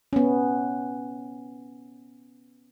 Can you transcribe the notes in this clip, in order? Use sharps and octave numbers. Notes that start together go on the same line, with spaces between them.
B3 C#4